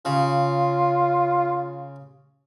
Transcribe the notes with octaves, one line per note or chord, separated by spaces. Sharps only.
C#3 F4